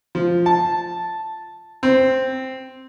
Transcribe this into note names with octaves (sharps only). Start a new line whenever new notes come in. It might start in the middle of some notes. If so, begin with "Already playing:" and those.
F3
A5
C4